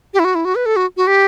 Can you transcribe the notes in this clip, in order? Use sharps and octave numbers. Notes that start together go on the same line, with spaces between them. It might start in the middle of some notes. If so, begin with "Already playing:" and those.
G4
E4
F#4
E4
F#4
B4
A4
F#4
F#4
G4